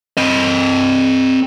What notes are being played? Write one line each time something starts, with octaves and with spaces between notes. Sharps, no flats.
C4 D#5